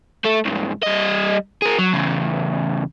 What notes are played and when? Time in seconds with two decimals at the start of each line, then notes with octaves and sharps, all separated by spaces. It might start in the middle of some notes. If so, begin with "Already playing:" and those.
0.25 A3 A4
0.45 C2 G#2
0.83 G3 D#5
1.62 G#4 A#4
1.79 F#3
1.93 E2 C#3